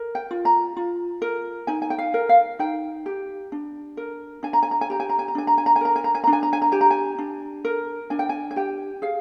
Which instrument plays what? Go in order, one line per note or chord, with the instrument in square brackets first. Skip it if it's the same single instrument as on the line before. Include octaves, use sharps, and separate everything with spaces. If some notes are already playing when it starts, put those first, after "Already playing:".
Already playing: [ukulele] A#4
G5
F4
A#5
F4
A#4
D#4 G#5
G#5
G5
F5
A#4
F5
D#4 G5
G4
D4
A#4
D4 G#5
A#5
G#5
A#5
G#5
G4 A#5
G#5
A#5
G#5
A#5
D4 G#5
A#5
G#5
A#5
G#5
A#4 A#5
G#5
A#5
G#5
D4 A#5
G#5
A#5
G#5
A#5
G4 G#5
A#5
G#5
D4
A#4
D4 G#5
G5
G#5
G#5
G4 G5
G#4 F5